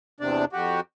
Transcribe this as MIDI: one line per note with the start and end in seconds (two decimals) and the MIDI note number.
0.20 0.45 40
0.20 0.45 48
0.20 0.45 62
0.20 0.45 74
0.53 0.80 41
0.53 0.80 66
0.53 0.80 67